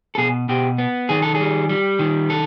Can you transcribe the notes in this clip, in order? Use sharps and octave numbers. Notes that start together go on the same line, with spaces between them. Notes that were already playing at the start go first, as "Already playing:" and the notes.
A4
B2 G#4
B2 G4
B3
D#3 G#4
A4
G#4
G3
G3
D#3
A4